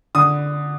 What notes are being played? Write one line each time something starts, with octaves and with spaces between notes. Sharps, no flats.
D3 D#6